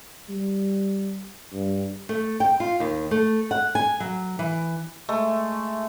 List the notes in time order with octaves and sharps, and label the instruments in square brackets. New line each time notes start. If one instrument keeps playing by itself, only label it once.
[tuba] G3
G2
[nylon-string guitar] A3
G5
F4
D#2
A3
F#5
G#5
F#3
E3
[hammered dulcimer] G#3 A3